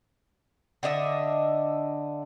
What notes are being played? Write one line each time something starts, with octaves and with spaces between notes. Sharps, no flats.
D3 D4 D#5 E5